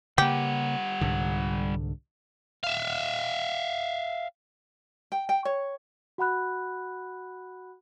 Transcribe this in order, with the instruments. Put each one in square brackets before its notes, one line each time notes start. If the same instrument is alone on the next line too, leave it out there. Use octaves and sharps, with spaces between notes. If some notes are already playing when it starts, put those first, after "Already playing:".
[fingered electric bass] C#3 A#3 [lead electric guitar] G3 F#5 [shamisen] G4
[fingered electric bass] C2 G#2 D3
[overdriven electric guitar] E5 F5
[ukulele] G5
G5
C#5
[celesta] F#4 F#5 B5 F#6